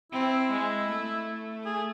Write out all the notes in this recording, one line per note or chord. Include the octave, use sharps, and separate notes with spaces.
C4 E4
G#3
A3
G#4